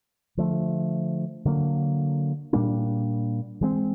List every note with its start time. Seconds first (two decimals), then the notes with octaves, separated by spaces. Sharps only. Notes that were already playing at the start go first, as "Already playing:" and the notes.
0.37 D3 F3 A3
1.45 D3 F#3 A#3
2.53 A#2 G3 A#3 D4
3.61 E3 G#3 C4